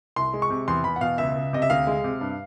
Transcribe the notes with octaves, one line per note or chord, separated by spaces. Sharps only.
C2 C6
G#3
C#6
C3
E2 C6
E2 B5
F#5
B2 F5
C#2 E5
C#2
C3 D#5
E5
D2 F5
G#3
C3
G2